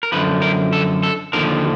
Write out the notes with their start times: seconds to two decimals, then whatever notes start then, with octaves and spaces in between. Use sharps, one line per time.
0.03 A#4
0.12 F#2 D3 F3 B4
0.42 A#4
0.73 A4
1.03 A4
1.33 D#2 D3 F3 A#4